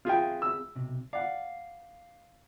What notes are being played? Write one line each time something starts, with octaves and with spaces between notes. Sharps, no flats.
C4 F4 G#4 E5 G5
E6
B1 C3
D5 F5 F#5